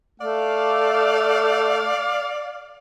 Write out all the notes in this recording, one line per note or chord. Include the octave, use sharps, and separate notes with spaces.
A3 D5 F5